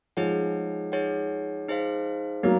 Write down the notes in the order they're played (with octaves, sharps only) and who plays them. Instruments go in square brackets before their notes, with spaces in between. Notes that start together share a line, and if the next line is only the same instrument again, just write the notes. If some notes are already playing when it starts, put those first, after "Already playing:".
[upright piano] F3 G#3 [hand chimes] D#4 G#4 C#5 F#5
[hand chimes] D#4 G#4 C#5 F#5
D#4 G#4 C5 F5
[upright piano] F#3 A#3 [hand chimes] D#4